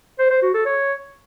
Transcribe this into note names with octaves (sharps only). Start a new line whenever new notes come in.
C5
C5
F#4
A4
C#5